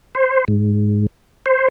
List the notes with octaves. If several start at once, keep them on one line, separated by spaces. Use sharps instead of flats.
C5
G#2
C5